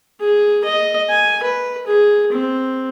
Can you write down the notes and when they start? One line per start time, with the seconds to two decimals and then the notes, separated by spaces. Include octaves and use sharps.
0.21 G#4
0.65 D#5
1.10 G#5
1.43 B4
1.87 G#4
2.32 C4